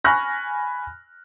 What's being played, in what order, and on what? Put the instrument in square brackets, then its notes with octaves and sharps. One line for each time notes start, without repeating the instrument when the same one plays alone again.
[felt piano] G#5 B5 C#6 F6 F#6 A#6